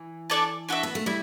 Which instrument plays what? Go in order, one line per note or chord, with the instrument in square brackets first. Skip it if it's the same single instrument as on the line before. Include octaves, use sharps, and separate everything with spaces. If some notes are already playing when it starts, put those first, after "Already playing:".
Already playing: [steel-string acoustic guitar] E3
[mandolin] D4 A4 D5 A5
D4 F#4 A4 E5
[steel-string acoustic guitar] B3
A3
[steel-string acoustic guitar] G3 [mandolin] E4